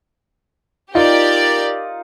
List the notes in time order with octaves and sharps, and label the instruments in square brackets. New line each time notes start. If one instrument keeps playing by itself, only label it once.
[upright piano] D#4 F4 [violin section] G4 A#4 D5